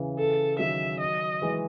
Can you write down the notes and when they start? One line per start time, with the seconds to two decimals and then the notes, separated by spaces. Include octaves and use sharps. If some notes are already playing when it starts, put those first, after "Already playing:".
Already playing: C#3 E3
0.18 A4
0.59 D#3 F#3 E5
1.00 D#5
1.42 E3 G#3